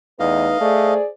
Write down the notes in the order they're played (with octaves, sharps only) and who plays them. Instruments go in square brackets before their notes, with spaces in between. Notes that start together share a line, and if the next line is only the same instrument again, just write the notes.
[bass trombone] E2 [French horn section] A3 B4 [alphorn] D#4 [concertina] D#5 F5
[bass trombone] A3 [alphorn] G#4 [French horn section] C5 D5